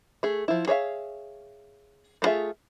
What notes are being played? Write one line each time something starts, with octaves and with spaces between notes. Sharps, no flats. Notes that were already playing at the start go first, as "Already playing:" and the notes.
A3 G#4
F3 E4
G#4 C#5 E5 F5
A3 A#3 F4 G#4 E5